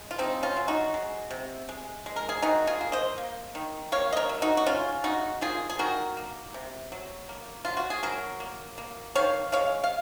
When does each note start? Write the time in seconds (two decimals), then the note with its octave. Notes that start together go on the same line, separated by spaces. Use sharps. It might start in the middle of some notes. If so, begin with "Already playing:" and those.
Already playing: G#3
0.11 F4
0.18 C#3 C4 D#4
0.43 C#4 F4
0.57 F#3
0.68 D#4 F#4
0.94 G#3
1.31 C3
1.69 G#3
2.06 G#3
2.16 A#4
2.29 G#4
2.42 D#3 D#4 F#4
2.67 F4 G#4
2.81 A#3
2.92 C5 D#5
3.18 A#3
3.55 D#3
3.92 A#3 C#5 F5
4.13 D#5
4.17 A#4 C#5
4.29 F#3
4.42 D#4 F#4
4.57 F#4
4.66 C#3 C#4 F4
5.04 C#3 D#4 F#4
5.41 D#3 F4 G#4
5.69 G#4
5.79 D#3 F#4 A#4
6.17 A#3
6.54 C3
6.92 F#3
7.29 A#3
7.65 F#3 F4
7.77 F#4
7.90 G#4
8.03 F#3 F#4 A#4
8.40 A#3
8.78 A#3
9.15 D#3 C#5 F5
9.52 G#3 C#5 F5
9.84 F5